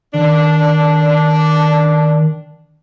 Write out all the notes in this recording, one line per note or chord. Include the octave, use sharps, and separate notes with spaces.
D#3 D4